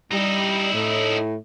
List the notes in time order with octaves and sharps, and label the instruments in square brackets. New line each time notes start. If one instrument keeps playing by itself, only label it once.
[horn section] G3 [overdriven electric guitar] D#4 E4
[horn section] A2